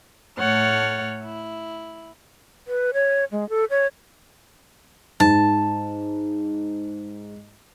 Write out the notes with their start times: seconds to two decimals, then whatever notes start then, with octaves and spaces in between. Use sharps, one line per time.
0.38 A2 A3 C#5 F#5 F6 A6
1.23 E4
2.68 B4
2.94 C#5
3.31 G#3
3.49 A4
3.70 C#5
5.20 G#2 A5